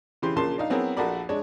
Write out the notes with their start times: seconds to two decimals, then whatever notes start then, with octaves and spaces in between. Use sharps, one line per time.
0.22 C#3 E3 G4 C6
0.36 A#1 A#2 C#3 A5 C6
0.58 D4 D#4 F5
0.70 F#3 B3 C4 E4 G#4 A#4
0.97 A#1 F#4 A4 A#4 D5 B5
1.29 G#3 D4 C#5